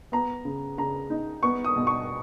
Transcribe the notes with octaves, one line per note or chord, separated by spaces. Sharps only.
B3 A#5
C#3
C#3 A#5
D#4
B3 C#6
D#6
B2
C#6